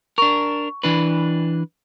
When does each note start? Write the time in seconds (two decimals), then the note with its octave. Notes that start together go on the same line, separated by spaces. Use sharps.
0.18 D4 A#4 C#6
0.83 E3 D4 B4